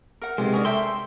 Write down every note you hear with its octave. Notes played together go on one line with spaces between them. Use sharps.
A#4 F#5
B1 C3 G#3
C#4 G#4 A#4 D5
A4 E5 G5 C6 E6 G6